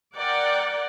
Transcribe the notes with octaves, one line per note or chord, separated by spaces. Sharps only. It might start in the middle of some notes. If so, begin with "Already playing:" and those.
A#4 D5 F#5 G5